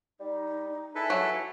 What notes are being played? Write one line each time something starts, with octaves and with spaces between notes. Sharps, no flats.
G3 D#4
E4 G#4 A4 B4
F#3